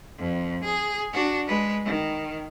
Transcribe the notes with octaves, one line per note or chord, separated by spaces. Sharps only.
F2
G#4
D4 F#4
G#3 B4
D#3